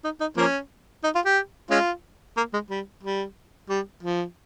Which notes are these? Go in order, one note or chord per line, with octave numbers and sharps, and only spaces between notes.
D#4
D#4
F3 A#3 C#4
D#4
F4
G4
G#3 C#4 F4
A#3
G#3
G3
G3
G3
F3